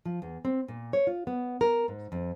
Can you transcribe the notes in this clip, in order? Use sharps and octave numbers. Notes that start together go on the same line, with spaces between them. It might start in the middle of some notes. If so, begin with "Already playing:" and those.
F3
E2
C4
A#2
C#5
F4
B3
A#4
G#2
F2